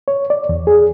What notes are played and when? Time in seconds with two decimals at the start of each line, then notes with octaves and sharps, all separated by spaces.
0.08 C#5
0.30 D5
0.49 E2
0.67 G#4